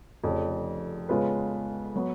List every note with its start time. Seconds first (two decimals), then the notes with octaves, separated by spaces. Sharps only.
0.24 F1 F2 C#3
1.09 C#3 G#3 B3 F4 B4
1.96 F#3 B3